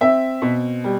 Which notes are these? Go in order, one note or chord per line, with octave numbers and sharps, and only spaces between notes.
C4 E5
B2
G3